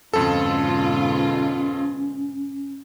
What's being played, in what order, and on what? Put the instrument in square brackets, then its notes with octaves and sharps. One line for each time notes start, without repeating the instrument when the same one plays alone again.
[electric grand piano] F2 A4 [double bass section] G#2 B2 D3 [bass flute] C#4 [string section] F4